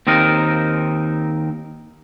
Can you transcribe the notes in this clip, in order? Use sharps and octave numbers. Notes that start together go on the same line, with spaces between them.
D#2 C4 D#4 A#4